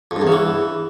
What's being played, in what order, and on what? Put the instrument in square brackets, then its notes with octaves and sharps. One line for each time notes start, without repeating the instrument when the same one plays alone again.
[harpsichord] F2
G2
E2
C#3
E3